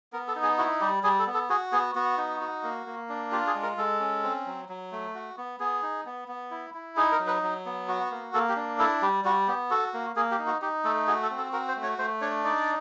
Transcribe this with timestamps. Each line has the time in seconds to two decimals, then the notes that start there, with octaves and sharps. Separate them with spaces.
0.13 B3 A#4
0.28 A4
0.36 D#4
0.43 G#4
0.58 E4 F#4
0.81 G3 G4
1.03 G3 G#4
1.19 A4
1.26 B3
1.34 A4
1.50 F#4 G#4
1.72 B3 G#4
1.95 B3 F#4
2.18 D#4
2.41 F#4
2.63 A#3
2.86 A#3
3.09 D4
3.32 F4 G4
3.47 G#4
3.55 G#3
3.63 A#4
3.77 G#3 A4
4.00 C#4
4.23 C4
4.46 F#3
4.69 F#3
4.92 A3
5.15 F#4
5.37 B3
5.60 B3 G#4
5.83 D#4
6.06 B3
6.28 B3
6.51 E4
6.74 E4
6.97 D#4 G#4
7.12 A#4
7.20 F#3
7.27 B4
7.43 F#3
7.66 B3
7.88 F#4
8.11 A#3
8.34 A#3 A4
8.49 G4
8.56 D4
8.79 E4 A4
9.02 G3 G4
9.25 G3 F#4
9.48 B3 G4
9.71 F#4 A4
9.94 A#3
10.16 A#3 G#4
10.31 G4
10.39 D#4
10.47 F#4
10.62 D#4 G4
10.84 A3 A4
11.07 F#4 G#4
11.23 A4
11.30 C4
11.38 A4
11.53 F#4 A#4
11.68 C5
11.76 A3
11.83 C#5
11.98 A3 C5
12.21 D4 C#5
12.44 D#4 D5